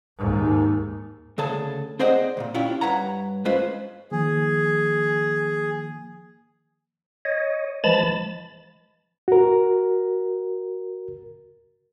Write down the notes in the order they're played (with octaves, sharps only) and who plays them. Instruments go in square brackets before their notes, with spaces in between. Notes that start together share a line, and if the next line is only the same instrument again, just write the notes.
[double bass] D#2 G#2
[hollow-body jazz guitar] D2 C#3 G#4 A4 A5
C4 G#4 C5 D5 D#5 F#5
D2 A#2
C#4 D4 E4 F4 G4
G2 B4 C#5 F#5 A#5
G#3 C#4 F4 B4 C5
[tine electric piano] D#3 F3 A#3 [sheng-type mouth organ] G#4
[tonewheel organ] C#5 D#5
E3 F3 G#3 A5 B5 A6
[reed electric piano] F#4 A#4